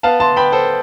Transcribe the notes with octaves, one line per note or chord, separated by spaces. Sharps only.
B3 F5 A5
A5 C6
B3 G5 B5
A4 C5